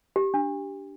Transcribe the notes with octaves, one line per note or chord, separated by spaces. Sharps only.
G4
D4